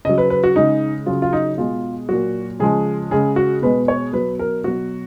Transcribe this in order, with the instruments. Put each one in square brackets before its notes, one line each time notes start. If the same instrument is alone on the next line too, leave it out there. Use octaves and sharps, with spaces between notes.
[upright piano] C#3 D#5
F#3
B4
B4
F#4
C#3 G#3 D#4
C#3 F#3 F4
F4
D#4
B2 G#3 F4
A#2 F#3 F#4
C#3 F3 G#3 G#4
C#3 G#3 G#4
F#4
B2 G#3 B4
C#5
B2 F#3 B4
A#4
B2 F#3 F#4